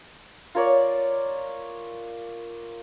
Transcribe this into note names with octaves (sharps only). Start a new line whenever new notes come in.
F4 A#4 C#5 D5